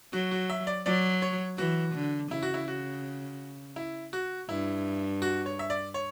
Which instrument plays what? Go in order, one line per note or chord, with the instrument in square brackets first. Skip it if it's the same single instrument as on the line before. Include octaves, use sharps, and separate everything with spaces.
[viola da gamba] F#3 [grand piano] F#4
[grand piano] F#4
E5
D5
[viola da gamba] F#3 [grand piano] D5
[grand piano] C#5
[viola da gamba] E3 [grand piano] F#4
[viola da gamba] D3
[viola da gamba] C#3 [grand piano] E4
[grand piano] F#4
E4
F#4
E4
F#4
[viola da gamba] G2 [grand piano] E4
[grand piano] F#4
C#5
E5
D5
C#5